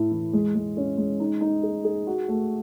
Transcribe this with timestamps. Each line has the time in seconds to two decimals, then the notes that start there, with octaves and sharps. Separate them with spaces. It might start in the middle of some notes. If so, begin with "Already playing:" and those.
Already playing: A2 A3 E4
0.11 E3
0.33 G#3
0.55 G#3
0.77 C#4
0.97 G#3
1.20 D#4
1.41 D#4
1.63 G#4
1.85 G#4
2.07 F#4
2.28 A3